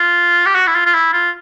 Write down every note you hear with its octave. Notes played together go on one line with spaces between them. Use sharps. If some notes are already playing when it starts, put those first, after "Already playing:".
Already playing: F4
G4
F#4
E4
F4
F4
E4
F4